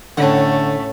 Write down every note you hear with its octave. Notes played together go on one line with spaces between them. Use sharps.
A2 D3 A3 C#4 F#5